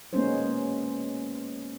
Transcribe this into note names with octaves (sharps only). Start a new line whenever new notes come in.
G#3 A#3 B3 C#4 D#4 C5